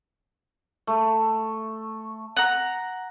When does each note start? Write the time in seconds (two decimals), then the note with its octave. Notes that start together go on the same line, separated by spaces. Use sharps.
0.87 A3
2.37 F#5 A#5